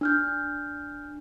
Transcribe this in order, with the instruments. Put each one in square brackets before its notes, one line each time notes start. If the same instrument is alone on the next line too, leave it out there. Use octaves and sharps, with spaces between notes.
[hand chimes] D4 F6 G6